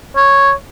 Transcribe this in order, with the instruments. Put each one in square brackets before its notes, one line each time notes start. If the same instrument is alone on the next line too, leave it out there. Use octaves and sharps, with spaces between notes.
[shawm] C#5